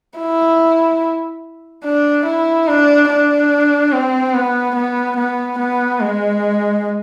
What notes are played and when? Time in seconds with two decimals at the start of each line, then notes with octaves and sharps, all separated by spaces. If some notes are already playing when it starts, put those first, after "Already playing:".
0.19 E4
1.85 D4
2.26 E4
2.68 D4
3.09 D4
3.93 C4
4.34 B3
4.76 B3
5.17 B3
5.59 B3
6.00 G#3